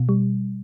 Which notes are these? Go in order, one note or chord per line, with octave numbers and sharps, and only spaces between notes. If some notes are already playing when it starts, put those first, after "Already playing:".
Already playing: B2
G3